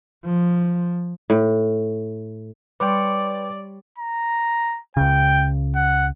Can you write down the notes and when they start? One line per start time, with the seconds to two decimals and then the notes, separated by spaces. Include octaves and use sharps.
0.25 F3
1.30 A2
2.80 G3 B4 C#5 D5 G5 C6 D6
3.98 A#5
4.97 C#2 C#3 G5
5.76 F#5